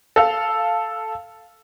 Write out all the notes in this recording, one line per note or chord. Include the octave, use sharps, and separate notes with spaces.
A4 F5